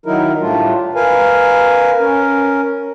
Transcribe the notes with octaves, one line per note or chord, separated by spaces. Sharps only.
D#3 F#3 D#4 E4 A#4
A2 G3 A3 D4 F4
A#4 B4 F5 G#5
C#4 A#4